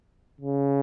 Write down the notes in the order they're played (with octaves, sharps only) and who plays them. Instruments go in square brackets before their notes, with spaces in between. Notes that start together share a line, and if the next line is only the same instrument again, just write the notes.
[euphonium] C#3